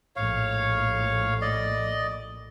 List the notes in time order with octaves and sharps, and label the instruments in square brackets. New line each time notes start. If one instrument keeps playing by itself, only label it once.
[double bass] A#1 A2 [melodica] C#5 F5
[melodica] D5 D#5